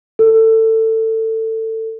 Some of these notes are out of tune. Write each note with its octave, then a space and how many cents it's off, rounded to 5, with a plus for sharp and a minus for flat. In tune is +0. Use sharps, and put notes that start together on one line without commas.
A4 +20